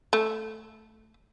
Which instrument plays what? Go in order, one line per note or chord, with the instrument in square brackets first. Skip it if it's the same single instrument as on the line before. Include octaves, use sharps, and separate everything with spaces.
[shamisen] A3